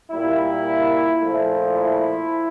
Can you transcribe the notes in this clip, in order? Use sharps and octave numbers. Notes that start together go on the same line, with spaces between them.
A#2 G3 A#3 E4
A#2 F3 A3
E4